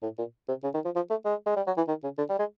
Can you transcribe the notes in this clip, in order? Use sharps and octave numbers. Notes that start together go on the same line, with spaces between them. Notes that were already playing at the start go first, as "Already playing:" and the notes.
A2
A#2
C3
C#3
D#3
F3
F3
A3
G#3
G#3
G3
F#3
E3
D#3
C#3
D3
G3
G#3